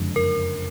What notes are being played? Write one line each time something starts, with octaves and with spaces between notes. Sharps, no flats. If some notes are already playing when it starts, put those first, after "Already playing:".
Already playing: F#1 F2 D3 G#3
A#4